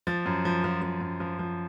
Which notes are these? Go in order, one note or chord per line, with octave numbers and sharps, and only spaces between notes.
F3 A6
F#2
F3
F3
F3
F#2
F3
F3